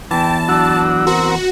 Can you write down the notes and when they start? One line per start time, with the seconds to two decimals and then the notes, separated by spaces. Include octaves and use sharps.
0.11 E2 E3 G5 A5
0.48 F#3 D4 F#4 E6
1.07 C4 F#4 A#4